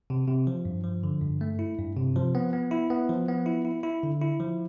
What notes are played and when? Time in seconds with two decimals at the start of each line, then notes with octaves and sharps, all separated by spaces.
0.10 C3
0.28 C3
0.47 F3
0.65 G2
0.84 F3
1.04 D3
1.22 G2
1.41 A3
1.59 E4
1.79 G2
1.96 C3
2.16 F3
2.35 B3
2.53 B3
2.71 E4
2.90 B3
3.09 F3
3.28 B3
3.46 E4
3.65 E4
3.83 E4
4.03 D3
4.22 E4
4.40 F3